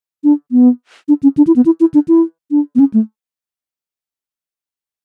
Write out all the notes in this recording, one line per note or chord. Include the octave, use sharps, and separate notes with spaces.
D4
B3
D4
C#4
D4
E4
B3
E4
E4
D4
E4
D4
B3
C#4
A3